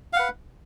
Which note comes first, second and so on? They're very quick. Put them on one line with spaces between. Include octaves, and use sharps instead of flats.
F5 F#5 B4